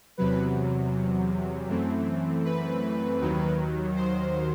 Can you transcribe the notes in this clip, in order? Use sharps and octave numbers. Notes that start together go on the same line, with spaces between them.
E2 C3 F#3 B4
F#2 E3 A3 C4
B4
D#2 D#3 F#3
C5